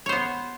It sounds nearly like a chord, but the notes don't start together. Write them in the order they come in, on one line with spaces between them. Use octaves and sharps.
C#5 C5 B3